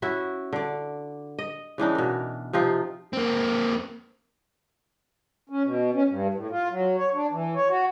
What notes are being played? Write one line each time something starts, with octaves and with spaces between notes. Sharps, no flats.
C#4 E4 F#4 E5
D3 D5
D#5
C#3 E3 D4 D#4
B2 A#4
C3 F3 D#4 F4
A#3 C4
C#4
B2
C#4
G2
A2
F4
F#3
C#5
D4
E3
C#5
F#4